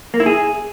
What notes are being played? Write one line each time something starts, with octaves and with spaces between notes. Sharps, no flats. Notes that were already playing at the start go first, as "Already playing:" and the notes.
A#3
E4
G#4